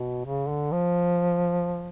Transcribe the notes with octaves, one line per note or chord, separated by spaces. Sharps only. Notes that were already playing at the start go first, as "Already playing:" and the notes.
Already playing: B2
C#3
D3
F3